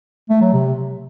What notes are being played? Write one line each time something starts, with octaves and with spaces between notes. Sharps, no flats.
A3
F#3
C3